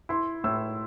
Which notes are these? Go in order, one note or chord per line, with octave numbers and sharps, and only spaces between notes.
E4 C6
A2 E6